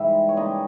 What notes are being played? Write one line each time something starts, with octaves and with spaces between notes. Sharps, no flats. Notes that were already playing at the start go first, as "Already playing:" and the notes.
Already playing: G#2 E3 G3 E5
C#5
C#3 G3 A#3 D#5